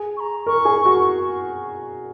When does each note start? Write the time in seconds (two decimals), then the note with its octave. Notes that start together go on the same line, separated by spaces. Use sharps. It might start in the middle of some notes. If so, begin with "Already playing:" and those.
Already playing: G#4
0.17 C#6
0.20 A#5
0.46 A#4 C#6
0.65 G#4
0.85 F#4